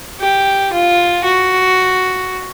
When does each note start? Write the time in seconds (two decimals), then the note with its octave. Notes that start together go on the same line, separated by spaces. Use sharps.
0.20 G4
0.73 F4
1.25 F#4